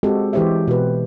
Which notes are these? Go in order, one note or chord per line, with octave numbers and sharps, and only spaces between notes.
G#3 C4 F#4 G4 A4
E3 G#3 G4 C5 C#5 E5
B2 B4